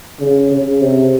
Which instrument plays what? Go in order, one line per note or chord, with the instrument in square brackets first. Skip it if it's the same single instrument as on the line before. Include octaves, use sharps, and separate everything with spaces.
[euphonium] C#3
C#3
C3